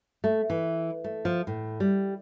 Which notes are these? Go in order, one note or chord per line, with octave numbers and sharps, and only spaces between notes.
A3
E3
A3
F3
A2
G3